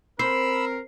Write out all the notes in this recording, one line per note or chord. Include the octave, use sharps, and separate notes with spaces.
C4 A#4 C5 B5 E6 C7